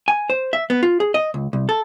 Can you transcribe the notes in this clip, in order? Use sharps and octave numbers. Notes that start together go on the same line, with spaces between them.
G#5
C5
E5
B3
F4
G#4
D#5
C#2
C2
A4